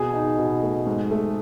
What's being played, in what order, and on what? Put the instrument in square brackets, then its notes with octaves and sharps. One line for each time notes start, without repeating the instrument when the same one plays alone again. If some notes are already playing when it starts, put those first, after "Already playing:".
Already playing: [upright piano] B2 [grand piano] G#4
[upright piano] D#4
B2
A3
G#2
A3